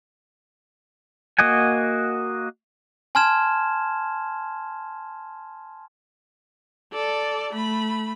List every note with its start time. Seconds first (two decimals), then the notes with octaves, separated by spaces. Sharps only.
1.39 A#3 F#4 D#5 F#5 G#5
3.15 G#5 A5 C6 F6 G#6 E7
6.93 A4 D5
7.53 A3 B5